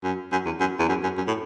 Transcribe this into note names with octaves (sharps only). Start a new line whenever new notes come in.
F#2
F#2
E2
F#2
E2
F#2
F#2
F#2
A2